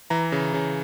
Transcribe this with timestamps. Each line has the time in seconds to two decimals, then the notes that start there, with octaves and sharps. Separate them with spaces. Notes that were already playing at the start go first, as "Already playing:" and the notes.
0.10 E3 A#5
0.32 C#3
0.54 C#3